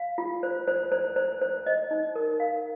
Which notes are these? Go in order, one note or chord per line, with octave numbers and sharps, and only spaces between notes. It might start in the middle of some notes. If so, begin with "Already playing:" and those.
Already playing: F5
F4
C5
C5
C5
C5
C5
D#5
D#4
A#4
F5